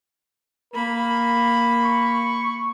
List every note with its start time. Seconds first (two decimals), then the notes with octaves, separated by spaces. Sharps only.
0.74 A#3 A#4 B5
1.85 C#6